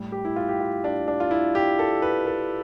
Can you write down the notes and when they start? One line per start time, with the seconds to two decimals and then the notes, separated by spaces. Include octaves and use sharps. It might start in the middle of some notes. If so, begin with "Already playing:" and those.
Already playing: A2 G3
0.12 G4
0.25 E4
0.36 F4
0.49 G4
0.60 F4
0.84 D4
1.08 D4
1.20 F4
1.31 E4
1.55 G4
1.79 A4
2.02 B4
2.27 A4